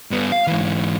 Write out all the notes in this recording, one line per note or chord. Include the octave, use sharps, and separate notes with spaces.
G2 B3
F5
G#2 E3